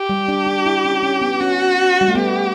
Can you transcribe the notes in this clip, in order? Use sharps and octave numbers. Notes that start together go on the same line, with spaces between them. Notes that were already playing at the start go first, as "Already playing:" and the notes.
Already playing: G4
G3
D4
D4
E4
C#4
C#4
B3
C#4 F#4
G3
A3
B3 G4